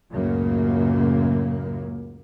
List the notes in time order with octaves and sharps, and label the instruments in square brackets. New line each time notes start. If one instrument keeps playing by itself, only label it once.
[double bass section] C#2 F#2 A2 C#3 F#3 A#3